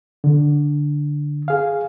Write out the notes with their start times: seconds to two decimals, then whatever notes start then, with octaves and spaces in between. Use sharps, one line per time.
0.24 D3
1.48 G#4 F5